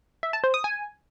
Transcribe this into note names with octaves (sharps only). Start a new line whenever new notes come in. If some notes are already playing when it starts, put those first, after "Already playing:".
E5
A5
C5
D#6
G#5